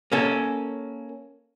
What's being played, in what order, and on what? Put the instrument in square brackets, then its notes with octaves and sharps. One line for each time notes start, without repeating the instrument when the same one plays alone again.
[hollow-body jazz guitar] A#3 C#4 A4